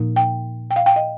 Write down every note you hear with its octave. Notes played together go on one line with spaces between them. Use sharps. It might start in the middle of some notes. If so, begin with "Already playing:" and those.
Already playing: A#2 F3 A#3 D#4
G5
G5
F5
G5
D#5